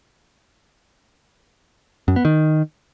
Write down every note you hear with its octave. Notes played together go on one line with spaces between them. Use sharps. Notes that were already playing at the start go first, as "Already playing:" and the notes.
F#2
B3
D#3